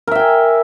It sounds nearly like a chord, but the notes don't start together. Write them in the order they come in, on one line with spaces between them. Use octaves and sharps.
A#4 E5 G5 G#5